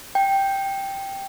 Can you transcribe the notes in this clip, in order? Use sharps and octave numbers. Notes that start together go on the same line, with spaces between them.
G5